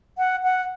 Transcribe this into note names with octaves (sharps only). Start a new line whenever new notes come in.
F#5
F#5